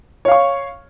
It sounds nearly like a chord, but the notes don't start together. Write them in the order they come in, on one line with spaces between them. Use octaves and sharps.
C#5 F5 C#6